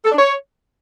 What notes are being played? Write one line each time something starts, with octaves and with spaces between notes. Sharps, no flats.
A4
D4
C#5